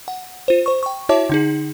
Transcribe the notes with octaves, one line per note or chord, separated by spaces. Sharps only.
F#5
F4 C5
C5 C#6
G5 C#6
E4 F#4 C#5 E5 A5 D6
D3 D#4 G#4